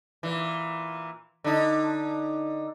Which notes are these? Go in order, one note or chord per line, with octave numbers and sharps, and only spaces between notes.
A#2 E3
D3 D#4